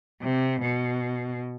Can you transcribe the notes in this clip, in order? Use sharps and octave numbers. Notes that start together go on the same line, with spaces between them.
C3
B2